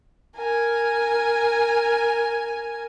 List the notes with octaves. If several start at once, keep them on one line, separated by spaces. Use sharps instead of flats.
A#4 G#5